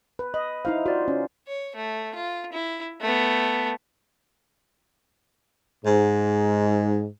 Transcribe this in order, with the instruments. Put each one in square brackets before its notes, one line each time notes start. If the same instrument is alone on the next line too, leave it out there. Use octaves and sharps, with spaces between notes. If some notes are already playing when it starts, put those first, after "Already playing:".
[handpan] B4
[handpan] D#5 [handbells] B5
[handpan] D#4 E4 F5 [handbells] C5
[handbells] F4 D5 [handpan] F#4 C5
[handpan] C#4
[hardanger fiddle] C#5
A3
F4
E4
A3 B3
[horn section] G#2